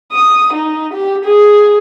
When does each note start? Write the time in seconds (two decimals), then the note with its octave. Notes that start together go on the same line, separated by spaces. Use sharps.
0.13 D#6
0.54 D#4
0.94 G4
1.25 G#4